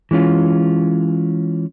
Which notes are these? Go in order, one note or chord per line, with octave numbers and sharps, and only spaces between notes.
E3 G#3 C#4 F4